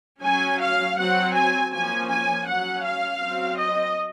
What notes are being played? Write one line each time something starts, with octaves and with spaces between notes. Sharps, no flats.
F#3 C#4 G#5
F5
F#3 C4 F#5
G#5
F3 A#3 C#4 G#5
G#5
F#3 C#4 F#5
F5
F#3 C4
D#5